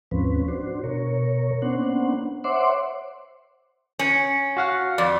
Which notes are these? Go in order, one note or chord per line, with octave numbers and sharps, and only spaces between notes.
D#2 G#2 F3 C4 C#4 B4
D4 F#4 C5
B2 A#4 C#5
A#3 B3 C#4 D4 C5 F#5
C5 C#5 E5 F#5 C6 D6
C#4
F#4 F5 F#5
F2 D5